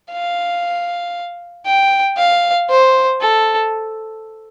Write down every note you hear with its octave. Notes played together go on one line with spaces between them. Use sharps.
F5
G5
F5
C5
A4